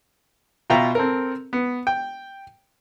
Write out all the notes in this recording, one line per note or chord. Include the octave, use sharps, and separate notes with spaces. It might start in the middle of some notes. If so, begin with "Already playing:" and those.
B2 F4 E5 G5 A#5
C4 A4 A#4
B3
G5